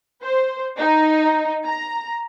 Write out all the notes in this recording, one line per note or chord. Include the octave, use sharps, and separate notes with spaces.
C5
D#4
A#5